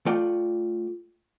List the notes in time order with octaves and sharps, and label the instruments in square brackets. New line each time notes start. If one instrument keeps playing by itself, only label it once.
[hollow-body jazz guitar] A3 F4 D5 G5